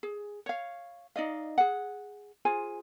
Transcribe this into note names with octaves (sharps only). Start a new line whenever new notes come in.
G#4
C#5 F5
D#4 D5 D#5 F5
G#4 F#5
F4 G#4 C5 G#5